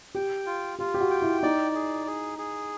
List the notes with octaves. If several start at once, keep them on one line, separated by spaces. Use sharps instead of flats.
G4 G5
F4
F4 G4
G4
F#4
G5
E4
D#4 D5
G#4
G#4
G#4